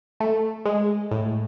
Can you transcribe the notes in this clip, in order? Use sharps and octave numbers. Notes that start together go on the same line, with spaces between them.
A3
G#3
A2